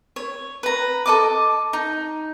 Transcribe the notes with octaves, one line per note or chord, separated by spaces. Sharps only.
C#5
B4 A#5
A4 D#5 D6
D#4